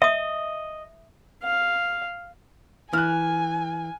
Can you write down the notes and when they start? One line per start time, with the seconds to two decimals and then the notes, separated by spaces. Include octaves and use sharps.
0.02 D#5 E5 D#6
1.43 F5
2.93 E3 G#5 F6 F#6